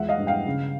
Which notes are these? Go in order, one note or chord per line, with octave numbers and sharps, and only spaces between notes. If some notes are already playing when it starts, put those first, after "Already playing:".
Already playing: E2 F3 G#3 E5 F#5
D#5 F5
G2
F5 G5
C#3